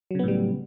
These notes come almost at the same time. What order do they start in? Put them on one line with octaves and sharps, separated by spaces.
F#3 C#3 B3 A2 G3